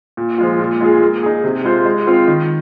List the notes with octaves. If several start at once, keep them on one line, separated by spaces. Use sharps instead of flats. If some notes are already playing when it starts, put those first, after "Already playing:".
A#2
F3 G#3 F4
A#2
G#3 F4 G#4
A#3
D#4 G#4
C3
G#3 F4 C5
G#3
C4 F4 C5
D#3